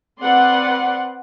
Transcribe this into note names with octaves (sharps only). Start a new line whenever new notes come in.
C4 B4 D5 F#5 C6